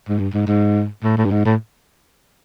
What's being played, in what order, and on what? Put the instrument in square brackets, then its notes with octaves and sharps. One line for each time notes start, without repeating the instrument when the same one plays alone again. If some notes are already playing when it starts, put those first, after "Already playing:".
[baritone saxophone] G#2
G2
G#2
G#2
A2
A2
G2
G#2
A2